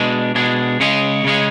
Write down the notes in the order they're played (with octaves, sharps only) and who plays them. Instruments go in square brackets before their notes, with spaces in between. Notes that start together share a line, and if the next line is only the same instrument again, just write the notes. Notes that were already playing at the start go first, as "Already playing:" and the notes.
Already playing: [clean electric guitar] B2 G#3 D4 G#4
B2 G#3 D4 G#4
C#3 G#3 C#4 G#4
C#3 G#3 C#4 G#4